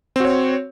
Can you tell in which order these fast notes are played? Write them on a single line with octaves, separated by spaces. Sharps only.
C4 F#4 C#5